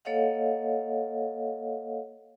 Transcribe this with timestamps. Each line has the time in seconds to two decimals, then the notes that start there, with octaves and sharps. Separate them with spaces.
0.05 A#3 A4 C#5 D#5 F5 F#5